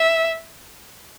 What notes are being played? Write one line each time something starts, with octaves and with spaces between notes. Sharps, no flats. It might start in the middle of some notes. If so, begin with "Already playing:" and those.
Already playing: E5